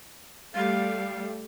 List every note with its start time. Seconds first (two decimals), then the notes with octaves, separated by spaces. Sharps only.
0.55 G3 A3 F5